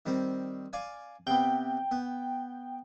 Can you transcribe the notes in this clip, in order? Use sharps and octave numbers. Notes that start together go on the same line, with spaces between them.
D#3 G3 C4
D5 F5 G#5
C3 B3 G5
B3